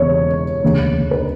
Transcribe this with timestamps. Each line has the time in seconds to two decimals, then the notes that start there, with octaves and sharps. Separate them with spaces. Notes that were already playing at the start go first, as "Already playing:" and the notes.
Already playing: E1 E2 C#3 C#5
0.63 E1 D2 C#3
1.11 B4